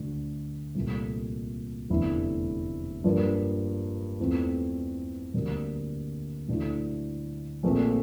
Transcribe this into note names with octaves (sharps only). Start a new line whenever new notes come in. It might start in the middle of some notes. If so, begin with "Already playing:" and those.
Already playing: D2 D3 A3 D4
C2 A#2 A3
F1 E2 D3 A3 E4
G2 F3 A#3 D4
E2 E3 A3 C4 F4
D2 D3 G3 A#3 D4
D2 D3 A3 E4
A#1 A#2 A3 C4